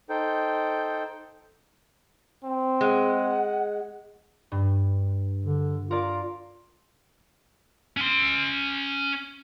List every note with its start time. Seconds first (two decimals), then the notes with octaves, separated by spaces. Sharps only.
0.09 D#4 A4 C5 G5
2.44 C4
2.81 G#3 F#5
4.52 G2
5.45 D3
5.91 F4 A#4 D5
7.97 C#4 C6